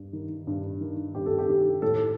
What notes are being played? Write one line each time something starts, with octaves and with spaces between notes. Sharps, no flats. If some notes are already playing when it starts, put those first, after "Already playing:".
Already playing: G2
D#3
G2
D#3
G2 G4
A4
G4
D#3
A2 A4